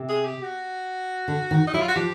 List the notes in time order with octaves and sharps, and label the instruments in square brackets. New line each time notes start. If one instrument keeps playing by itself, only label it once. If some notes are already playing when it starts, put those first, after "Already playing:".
Already playing: [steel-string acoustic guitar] C3
[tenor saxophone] G#4
G4
F#4
[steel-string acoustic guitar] D3
D#3
[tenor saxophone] D#4
[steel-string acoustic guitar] F#3 [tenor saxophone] E4
[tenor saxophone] F4
F#4
[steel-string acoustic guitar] F3 [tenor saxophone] G4